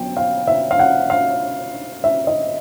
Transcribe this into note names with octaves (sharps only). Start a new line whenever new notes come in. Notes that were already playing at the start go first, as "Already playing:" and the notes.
Already playing: F#3 B3 G5
F5
E5
F5
F#5
F5
E5
D#5